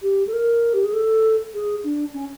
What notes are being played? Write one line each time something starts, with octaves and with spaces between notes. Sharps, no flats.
G4
A4
A#4
G4
G#4
A4
G#4
D4
C#4